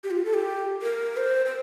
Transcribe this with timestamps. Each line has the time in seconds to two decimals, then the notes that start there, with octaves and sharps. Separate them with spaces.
0.04 G4
0.11 F4
0.25 A4
0.34 G4
0.82 A#4
1.17 C5
1.46 C5